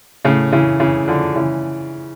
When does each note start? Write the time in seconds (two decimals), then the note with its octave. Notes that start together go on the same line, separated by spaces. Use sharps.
0.25 A2 C#3
0.52 C#3 E3
0.80 C#3 E3
1.08 D3 F3
1.35 C#3 E3